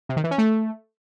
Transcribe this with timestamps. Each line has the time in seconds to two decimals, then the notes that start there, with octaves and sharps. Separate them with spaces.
0.09 C3
0.17 D#3
0.24 E3
0.31 C#4
0.38 A3